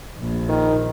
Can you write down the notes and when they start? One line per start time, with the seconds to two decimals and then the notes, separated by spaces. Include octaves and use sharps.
0.18 A#1
0.49 D#3